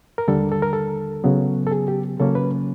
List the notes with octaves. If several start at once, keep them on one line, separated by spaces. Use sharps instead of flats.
A#4
D#2 D3 G3 A4
A4
A#4
A4
C#3 F#3 B3
A4
G#4
G4
C#3 F#3 A#3 C#4 A4
B4